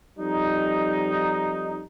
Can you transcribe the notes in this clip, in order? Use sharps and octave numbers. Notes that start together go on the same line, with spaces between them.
F2 G3 D#4